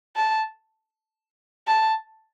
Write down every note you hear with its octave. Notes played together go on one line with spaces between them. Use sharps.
A5
A5